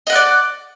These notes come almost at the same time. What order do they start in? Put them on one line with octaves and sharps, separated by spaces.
D#5 F#5 F#6 D5